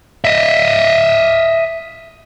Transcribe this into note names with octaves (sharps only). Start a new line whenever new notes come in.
D#5 E5